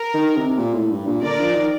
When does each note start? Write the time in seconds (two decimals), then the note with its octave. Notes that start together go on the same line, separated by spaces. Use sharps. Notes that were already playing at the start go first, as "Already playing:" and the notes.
Already playing: A#4
0.14 D#3
0.37 C3
0.58 A#2
0.74 A2
0.91 G2
1.07 A#2
1.23 D3 A#4 D5
1.39 F3
1.55 D#3